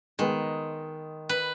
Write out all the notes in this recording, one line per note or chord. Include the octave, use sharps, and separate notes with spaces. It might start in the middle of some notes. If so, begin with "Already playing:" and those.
D#3 G#3 B3
B4